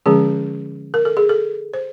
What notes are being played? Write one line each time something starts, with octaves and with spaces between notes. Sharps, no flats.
D3 F3 G#3 C#4 G#4
A#4
A4
G#4
A4
C5